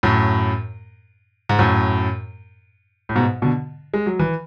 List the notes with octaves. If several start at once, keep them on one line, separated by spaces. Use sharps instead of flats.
F#2 A2
G#2
F#2 A2
A2
G#2 B2
B2 D3
G#3
F#3
E3